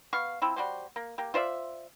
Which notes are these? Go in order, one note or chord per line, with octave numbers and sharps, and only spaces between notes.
B3 F5 C#6
F3 C4 E4
G3 F#4 G4 C5
A#3
A#3 G4
F4 C5 D5 E5